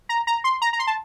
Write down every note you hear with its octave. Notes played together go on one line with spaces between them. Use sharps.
A#5
A#5
C6
A#5
A#5
C6
A5